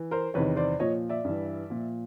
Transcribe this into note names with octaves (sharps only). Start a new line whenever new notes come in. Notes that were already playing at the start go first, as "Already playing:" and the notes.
Already playing: E3
A#4 C5
E2 C3 D#3 B4 C#5
C5 D5
A#2 F3 C#5 D#5
D5 E5
G2 E3
A#2 F3